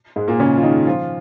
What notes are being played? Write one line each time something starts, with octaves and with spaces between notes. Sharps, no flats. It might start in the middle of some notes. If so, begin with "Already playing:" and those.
G#2 G#3
A#2 A#3
C#3 C#4
F4
D#3 D#4
F3 F4